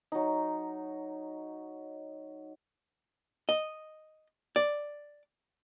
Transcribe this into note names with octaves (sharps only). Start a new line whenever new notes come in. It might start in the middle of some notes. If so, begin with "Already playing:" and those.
F#3 D#4
D#5
D5